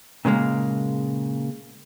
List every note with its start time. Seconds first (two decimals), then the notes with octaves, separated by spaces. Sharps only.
0.25 A#2 C#3 G#3 A#3